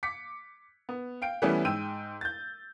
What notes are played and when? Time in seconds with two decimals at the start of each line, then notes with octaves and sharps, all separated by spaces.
0.03 D6 B6 C#7
0.89 B3
1.22 F5 G5 D7
1.42 E3 G3 A3 B3 C#4 E4
1.64 G#2 G5 E6 D#7
2.21 G6 A6